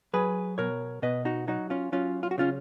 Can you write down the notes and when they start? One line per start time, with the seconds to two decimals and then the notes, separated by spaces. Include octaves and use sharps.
0.13 F#3 G#4 B4
0.58 B2 A#4 C#5
1.02 B2 B4 D#5
1.25 D#4 F#4
1.48 F#3 D#4 F#4
1.70 C#4 F4
1.92 F#3 C#4 F4
2.23 F4
2.31 F#4
2.38 C#3 C#4 F4